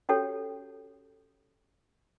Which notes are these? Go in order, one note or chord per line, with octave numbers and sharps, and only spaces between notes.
C#4 F#4 G4 A4 C#5 G5